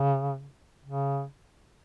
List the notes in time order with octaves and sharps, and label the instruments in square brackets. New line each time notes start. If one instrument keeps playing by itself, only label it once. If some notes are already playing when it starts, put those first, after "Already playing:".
Already playing: [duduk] C#3
C#3